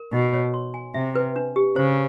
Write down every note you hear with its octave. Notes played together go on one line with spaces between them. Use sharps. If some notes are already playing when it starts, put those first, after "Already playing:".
Already playing: A#4
B2 D#4
C#5
C6
G#5
C3 E5
B4
D4
G4
C#3 C5